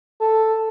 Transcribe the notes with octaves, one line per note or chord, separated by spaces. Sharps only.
A4